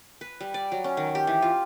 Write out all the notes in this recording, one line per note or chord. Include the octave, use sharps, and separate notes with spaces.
B4
G3
D5
F#3
C#4
D#3
G4
E3
F4